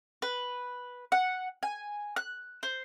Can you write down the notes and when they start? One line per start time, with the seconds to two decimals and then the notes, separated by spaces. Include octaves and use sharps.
0.22 B4
1.12 F#5
1.63 G#5
2.16 F#6
2.63 C5